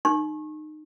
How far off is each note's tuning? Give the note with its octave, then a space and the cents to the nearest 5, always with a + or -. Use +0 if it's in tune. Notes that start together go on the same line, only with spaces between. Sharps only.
D#4 -20 C#6 -35